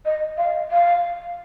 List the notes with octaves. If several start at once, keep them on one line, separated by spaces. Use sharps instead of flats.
D#5
F5
F5